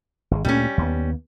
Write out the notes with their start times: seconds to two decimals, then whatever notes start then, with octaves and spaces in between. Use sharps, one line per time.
0.31 G#1 D#3 G#3
0.45 D2 A#2 G3 A3 C#4
0.78 D#2 B3